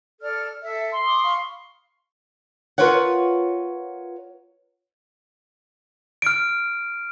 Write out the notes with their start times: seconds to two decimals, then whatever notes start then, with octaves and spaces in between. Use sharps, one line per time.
0.21 A4 D5 F6
0.62 A4 E5
0.93 C6
1.06 D6 D#6
1.24 F5 B5 C#6
2.78 F4 A#4 B4 C#5 F#5
6.22 F6 D7